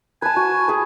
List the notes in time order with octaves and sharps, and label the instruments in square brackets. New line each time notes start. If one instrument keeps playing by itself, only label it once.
[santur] B4 A5 [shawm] G#5
[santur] F#4
G#4 B4